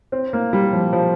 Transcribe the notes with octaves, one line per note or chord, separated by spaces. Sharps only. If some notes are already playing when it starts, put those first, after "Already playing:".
C4
A#3
G3
F3
F3